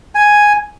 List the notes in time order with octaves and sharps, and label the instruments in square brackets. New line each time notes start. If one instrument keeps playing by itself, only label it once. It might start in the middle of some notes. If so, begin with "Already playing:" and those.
[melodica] G#5